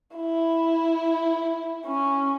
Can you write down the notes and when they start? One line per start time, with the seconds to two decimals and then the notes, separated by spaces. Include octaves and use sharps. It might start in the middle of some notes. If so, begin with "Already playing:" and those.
0.16 E4
1.87 C#4